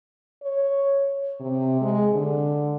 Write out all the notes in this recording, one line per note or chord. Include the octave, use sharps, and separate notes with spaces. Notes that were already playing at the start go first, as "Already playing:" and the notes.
C#5
C3
G#3
D3